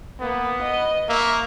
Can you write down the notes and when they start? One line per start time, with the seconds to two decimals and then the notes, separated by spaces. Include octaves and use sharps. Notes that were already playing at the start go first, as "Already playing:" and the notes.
0.20 A#3 B3
0.62 D#5
1.09 A#3 E5 C#6